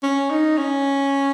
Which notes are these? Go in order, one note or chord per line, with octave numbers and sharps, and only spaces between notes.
C#4
D#4
C#4